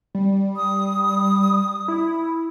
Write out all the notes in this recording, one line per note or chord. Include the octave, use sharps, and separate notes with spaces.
G3
D#6
E4